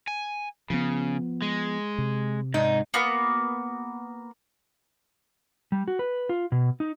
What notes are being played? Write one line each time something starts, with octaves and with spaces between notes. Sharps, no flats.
G#5
C#3 F3 B3
G#3
C3
G#2 D#4
A#3 B3 F#4
G3
F#4
B4
F4
B2
D#4